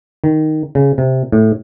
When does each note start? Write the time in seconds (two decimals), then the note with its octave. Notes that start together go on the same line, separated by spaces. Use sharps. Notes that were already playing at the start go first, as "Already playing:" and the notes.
0.24 D#3
0.75 C#3
0.98 C3
1.32 A2